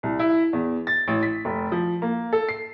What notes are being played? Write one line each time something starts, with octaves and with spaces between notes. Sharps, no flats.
C2
E4
E2
A6
A1
B6
F1
F3
A#3
A4
C7